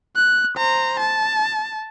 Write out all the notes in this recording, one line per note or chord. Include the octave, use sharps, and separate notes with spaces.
F#6
C5 A#5
A5